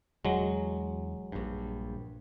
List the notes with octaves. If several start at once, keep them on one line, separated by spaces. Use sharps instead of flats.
E1 F#3 G#3
A#1 G2